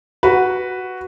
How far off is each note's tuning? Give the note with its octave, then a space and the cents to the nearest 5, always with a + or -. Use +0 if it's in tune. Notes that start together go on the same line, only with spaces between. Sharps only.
F#4 +0 B4 +0